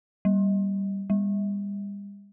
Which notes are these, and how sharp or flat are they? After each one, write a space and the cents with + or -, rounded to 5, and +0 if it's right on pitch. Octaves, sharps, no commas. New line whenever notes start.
G3 +0
G3 +40